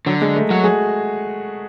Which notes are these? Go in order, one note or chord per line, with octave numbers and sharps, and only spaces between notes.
D3 F#3
G#3
A3
F#3 F#4
G#4